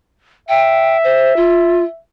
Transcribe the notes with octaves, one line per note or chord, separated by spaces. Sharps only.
E5 G5
C5
F4